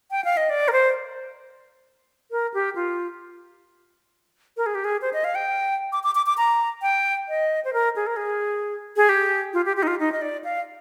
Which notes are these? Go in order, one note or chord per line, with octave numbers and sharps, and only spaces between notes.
G5
F5
D#5
D5
A#4
C5
A#4
G4
F4
A#4
G#4
G4
G#4
C5
D#5
F5
G5
D6
D6
D6
D6
A#5
G5
D#5
C5
A#4
G#4
A#4
G#4
G#4
G4
F4
G4
G4
D#4
F4
D#4
D#5
D5
F5